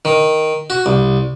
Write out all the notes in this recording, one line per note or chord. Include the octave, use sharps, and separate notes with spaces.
D#3
F#4
C2